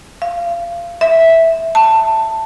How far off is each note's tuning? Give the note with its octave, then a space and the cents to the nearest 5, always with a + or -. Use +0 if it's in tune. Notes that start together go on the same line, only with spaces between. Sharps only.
F5 -20
E5 -5
A5 +15